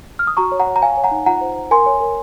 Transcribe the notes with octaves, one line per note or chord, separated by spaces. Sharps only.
F6
D#6
F#4 A#5 C#6
C#5
F#5 A#5
C#5
A#5
C#5 F5 G#5
C#5
F#5 A#5
D#4
F4 F#5 A#5
C5
C5
A#4 G#5 C6
C#5
A#4